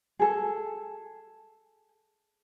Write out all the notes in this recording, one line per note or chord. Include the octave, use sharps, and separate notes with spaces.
G#4 A4